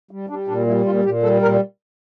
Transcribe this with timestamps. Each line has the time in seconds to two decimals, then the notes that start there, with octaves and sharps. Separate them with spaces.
0.11 G3
0.29 G3 D4
0.48 A#2 D4
0.67 G3 E4
0.85 A#2 F4
1.04 A#2 G4
1.23 G3 A4
1.42 A#2 A#4